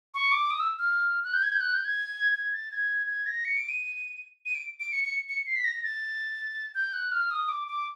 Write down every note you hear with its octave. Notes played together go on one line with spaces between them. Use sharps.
C#6
D6
D#6
E6
F6
F#6
G6
G#6
G6
F#6
G6
G#6
G#6
A6
G#6
G#6
A#6
C#7
D7
D#7
D#7
D7
D7
C#7
C#7
C#7
C7
B6
A#6
A6
G6
F#6
F6
D#6
D6
D6